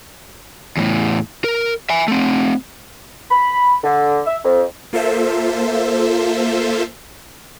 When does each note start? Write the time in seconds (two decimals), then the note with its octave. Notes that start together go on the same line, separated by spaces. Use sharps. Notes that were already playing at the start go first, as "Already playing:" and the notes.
0.77 E2 A2
1.44 A#4
1.90 E5 G#5
2.08 A3 C4
3.31 B5
3.84 D3
4.26 E5
4.44 F2
4.93 A#3 F4 A4 C5 E5